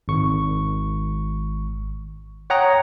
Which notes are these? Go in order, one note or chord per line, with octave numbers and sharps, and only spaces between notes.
G#1 C#6
C#5 F#5 G5 A#5 D#6 A#6